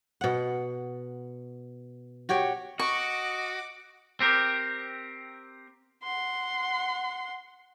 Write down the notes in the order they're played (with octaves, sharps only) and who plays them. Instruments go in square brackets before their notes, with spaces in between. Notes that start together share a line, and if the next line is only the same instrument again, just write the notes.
[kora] B2 F#5
F#4 G4 C#5 G5
[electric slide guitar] F#4 [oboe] D#5 [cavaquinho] C#6 [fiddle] D6
[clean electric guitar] C4 G4 A#4
[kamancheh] F#5 C6